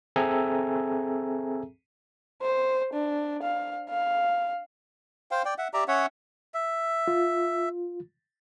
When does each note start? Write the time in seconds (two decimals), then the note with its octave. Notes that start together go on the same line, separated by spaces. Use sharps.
0.16 C4 G#4 A4 E5 G#5 A#5
2.42 C5
2.93 D4
3.43 F5
3.90 F5
5.31 C5 F5 G5
5.45 D5 G5
5.58 E5 F#5
5.74 G4 D5 E5 A#5
5.88 C#4 C#5 E5 F#5
6.54 E5
7.08 F4